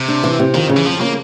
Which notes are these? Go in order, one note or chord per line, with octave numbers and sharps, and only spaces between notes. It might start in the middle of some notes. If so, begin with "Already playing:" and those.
Already playing: C3
D4
E3
C3
F2 D#3
C#3
E3
F2 F3
C#3 A#3